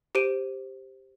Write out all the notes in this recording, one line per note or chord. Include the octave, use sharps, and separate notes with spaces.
G4 C5 D7 D#7